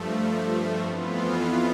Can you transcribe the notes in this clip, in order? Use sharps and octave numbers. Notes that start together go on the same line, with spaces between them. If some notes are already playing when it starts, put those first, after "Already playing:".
Already playing: G2 F3 A3
F2 E3 B3 F4